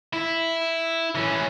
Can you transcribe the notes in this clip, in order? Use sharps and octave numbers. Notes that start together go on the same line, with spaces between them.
E4
E3 C#4